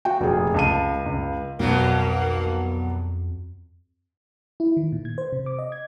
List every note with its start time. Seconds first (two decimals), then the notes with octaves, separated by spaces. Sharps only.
0.05 F#4 G5
0.21 F1 A#2 G#4
0.54 C#2 A5 D#7
1.06 C#2
1.59 B1 F2 B2 F#3 G3 A#3
4.60 E4
4.77 D#3
4.92 A#2
5.05 G#6
5.18 C5
5.33 C3
5.46 D6
5.59 D#5
5.72 G#6